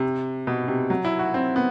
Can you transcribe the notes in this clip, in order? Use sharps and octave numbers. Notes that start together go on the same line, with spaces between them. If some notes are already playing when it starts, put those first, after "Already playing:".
Already playing: C3
B2
C3
F#3
E4
F#4
C4
B3